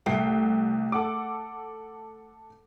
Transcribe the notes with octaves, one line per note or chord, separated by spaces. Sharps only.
C2 A3 G5 C7
A4 F#5 D6